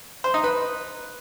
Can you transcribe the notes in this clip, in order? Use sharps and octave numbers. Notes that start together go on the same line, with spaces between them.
C5
D#4
B4